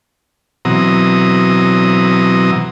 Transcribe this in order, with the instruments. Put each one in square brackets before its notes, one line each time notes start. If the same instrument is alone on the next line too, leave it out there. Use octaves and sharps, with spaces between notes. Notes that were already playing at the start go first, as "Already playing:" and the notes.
[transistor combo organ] B2 E3 F#3 C4 A#5 D#6